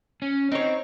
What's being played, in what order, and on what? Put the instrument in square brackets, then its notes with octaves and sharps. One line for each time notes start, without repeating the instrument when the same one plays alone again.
[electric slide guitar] C#4
[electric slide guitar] C4 [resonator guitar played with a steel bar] D#4 C#5